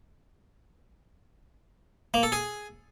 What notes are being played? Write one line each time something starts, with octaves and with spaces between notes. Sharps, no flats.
A#3
A4
G#4